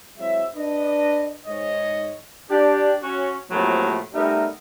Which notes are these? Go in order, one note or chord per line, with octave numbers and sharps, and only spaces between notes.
F#3 G#3 C4 E4 E5
D4 B4 D#5
G#2 G#3 C#5 D#5
D4 G4
C#4 F#4
A2 C3 F3 F#3 A#3
G3 A3 B3 D#4 A#4 E5